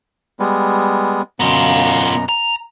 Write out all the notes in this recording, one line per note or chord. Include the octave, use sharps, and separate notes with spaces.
G3 G#3 B3
F#2 B2 B3 F4 A#5
A#5